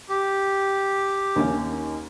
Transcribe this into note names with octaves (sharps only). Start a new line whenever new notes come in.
G4
D#2 D#3 C#4